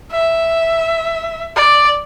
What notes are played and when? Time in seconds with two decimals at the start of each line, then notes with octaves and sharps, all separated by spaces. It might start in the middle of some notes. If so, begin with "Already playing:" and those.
0.11 E5
1.55 D5